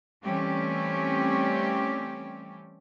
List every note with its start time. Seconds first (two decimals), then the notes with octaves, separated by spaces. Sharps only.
0.24 E3 G3 A3 C4 C#4 G4